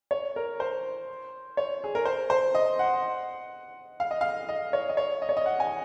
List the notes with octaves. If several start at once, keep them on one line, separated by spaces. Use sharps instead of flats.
C#5
A#4
C5
C#5
G#4
A#4
C5
C5
D#5
F#5
F5
D#5
F5
D#5
C#5
D#5
C#5
D#5
C#5
D#5
F#5
G#5